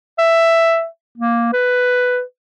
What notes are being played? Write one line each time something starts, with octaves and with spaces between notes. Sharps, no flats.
E5
A#3
B4